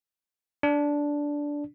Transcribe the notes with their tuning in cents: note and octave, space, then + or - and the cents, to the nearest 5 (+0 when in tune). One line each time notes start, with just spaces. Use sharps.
D4 -10